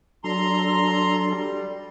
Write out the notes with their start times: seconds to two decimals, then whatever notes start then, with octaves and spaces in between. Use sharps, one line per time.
0.24 F#3 D4 A4 A#5 C6
1.29 G3